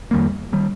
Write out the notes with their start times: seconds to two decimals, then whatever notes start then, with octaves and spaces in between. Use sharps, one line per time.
0.11 F2 D#3 G3 A#3
0.53 D#3 G3